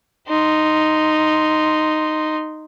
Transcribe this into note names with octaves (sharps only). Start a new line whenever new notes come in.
D#4 C6